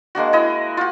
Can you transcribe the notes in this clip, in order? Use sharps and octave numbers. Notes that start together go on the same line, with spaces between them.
G#3 A#3 D4 F#4
E4 D#5
F4 F#4